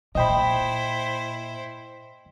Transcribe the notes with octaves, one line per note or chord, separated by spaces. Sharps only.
A#2 E4 C5 D#5 G5 B5